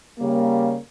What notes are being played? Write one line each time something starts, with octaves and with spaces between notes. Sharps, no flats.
C#3 G3 A#3